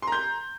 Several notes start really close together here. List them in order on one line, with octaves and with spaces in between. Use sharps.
C6 A#5 G6